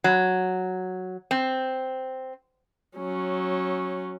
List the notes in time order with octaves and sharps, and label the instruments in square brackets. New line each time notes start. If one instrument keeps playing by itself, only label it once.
[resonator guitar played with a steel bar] F#3
C4
[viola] F#3 C#4